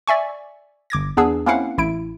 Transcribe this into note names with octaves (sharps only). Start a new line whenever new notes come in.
D5 E5 G#5 C#6
G1 D6 G#6 A#6
E2 B3 D4 G#4 E6
A#3 C4 C#4 E4 F5 F#5
A1 E4 D7